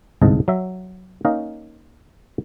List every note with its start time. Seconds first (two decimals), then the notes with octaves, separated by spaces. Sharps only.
0.21 G1 C2 G#2 D#5 A5
0.48 F#3 E5
1.25 A#3 C#4 D#4 D#5 F5